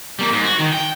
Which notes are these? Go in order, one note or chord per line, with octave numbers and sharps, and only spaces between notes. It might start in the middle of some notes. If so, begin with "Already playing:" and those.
G3 A#3
G#2
F#4
D#3
G5